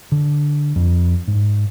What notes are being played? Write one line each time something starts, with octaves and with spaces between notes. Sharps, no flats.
D3
F2
G#2